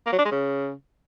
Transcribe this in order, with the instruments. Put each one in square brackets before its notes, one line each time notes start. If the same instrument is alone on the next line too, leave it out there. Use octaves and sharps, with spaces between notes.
[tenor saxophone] A#3
F#3
D4
G#3
C#3